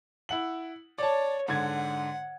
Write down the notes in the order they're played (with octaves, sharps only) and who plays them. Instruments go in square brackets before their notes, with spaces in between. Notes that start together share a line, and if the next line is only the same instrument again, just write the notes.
[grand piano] E4 F#5 F#7
[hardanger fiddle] C#5 [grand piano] D5 A5
[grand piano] G#2 D3 G#6 [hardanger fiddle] F#5